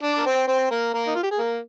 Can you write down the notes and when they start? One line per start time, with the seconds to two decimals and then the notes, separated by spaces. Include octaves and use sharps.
0.03 D4 D5
0.18 A#4
0.26 C4 C5
0.48 C4 C5
0.71 A#3 A#4
0.94 A#3 A#4
1.07 D#4
1.15 F4
1.23 G4
1.31 G#4
1.39 A#3 A#4